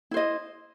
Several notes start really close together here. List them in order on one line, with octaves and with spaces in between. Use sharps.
E4 C5 D#5